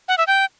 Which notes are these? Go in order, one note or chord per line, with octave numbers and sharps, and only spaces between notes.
F#5
E5
G5